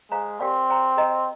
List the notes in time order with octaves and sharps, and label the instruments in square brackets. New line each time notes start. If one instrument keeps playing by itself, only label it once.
[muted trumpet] G#3 [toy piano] G#4 C5 F5 A#5
[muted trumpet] C4 [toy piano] G4 A#4 D5 F5
[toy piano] C5 G5 A#5
G#4 D#5 A#5